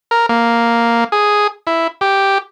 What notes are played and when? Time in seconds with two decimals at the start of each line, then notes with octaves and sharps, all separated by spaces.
0.11 A#4
0.29 A#3
1.12 G#4
1.67 E4
2.01 G4